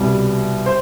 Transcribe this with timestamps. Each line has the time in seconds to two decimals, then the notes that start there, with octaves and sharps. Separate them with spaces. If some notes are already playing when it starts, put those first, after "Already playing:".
Already playing: C2 B2 G3
0.66 C5